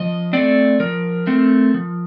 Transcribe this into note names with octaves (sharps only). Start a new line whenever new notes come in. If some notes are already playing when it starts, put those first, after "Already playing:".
Already playing: F3 D#5
A3 C4 D5
F3 A#4
A3 C4
F3